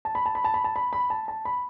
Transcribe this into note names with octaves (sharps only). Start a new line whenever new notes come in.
A5
B5
A5
B5
A5
B5
A5
B5
B5
A5
A5
B5